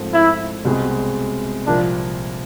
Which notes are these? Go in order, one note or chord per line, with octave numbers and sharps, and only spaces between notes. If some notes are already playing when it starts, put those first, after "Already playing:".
Already playing: G#2 F3 A3 C4
E4
C2 B2 G#3 C4
C2 A#2 F3 A#3 D4